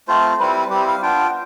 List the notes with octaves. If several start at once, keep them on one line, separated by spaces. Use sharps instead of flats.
A3 C4 F4 C5
G3 C4 E4 B4
G3 C4 E4 G4
F5
B3 D4 F4 G5